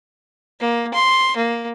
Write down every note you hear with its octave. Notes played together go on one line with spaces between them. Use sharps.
A#3
C6
A#3